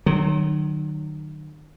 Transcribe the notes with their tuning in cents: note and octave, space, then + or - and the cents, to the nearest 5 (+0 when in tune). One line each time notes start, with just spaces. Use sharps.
D#3 -40 F#3 +10